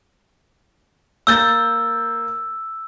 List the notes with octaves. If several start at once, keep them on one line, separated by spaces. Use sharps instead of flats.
A#3 E6 G6 A6